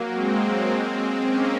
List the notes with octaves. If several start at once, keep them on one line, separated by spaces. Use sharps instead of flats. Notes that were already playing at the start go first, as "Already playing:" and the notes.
Already playing: F#3 A#3
G#3 C4
A#3 C#4